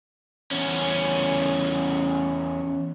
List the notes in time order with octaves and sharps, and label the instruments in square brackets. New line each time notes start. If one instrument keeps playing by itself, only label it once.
[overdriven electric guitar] E2 C#4